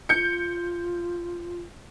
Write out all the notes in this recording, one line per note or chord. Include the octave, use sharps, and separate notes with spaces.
F4 G6 C#7